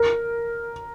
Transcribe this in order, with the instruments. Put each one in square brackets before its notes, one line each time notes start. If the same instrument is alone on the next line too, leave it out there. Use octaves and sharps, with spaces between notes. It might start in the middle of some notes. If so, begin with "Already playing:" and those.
Already playing: [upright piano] A#4